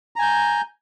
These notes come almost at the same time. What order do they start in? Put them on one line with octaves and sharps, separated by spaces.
A#5 G#5 G6